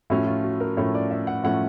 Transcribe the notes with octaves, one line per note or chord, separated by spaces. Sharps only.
A2 F3 A3 C#4 F#4
F4
F#4
A#4
A2 F3 A3 C#4 C#5
D5
E5
F#5
A2 F3 A3 C#4 F#5